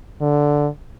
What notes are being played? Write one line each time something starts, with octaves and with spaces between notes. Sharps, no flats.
D3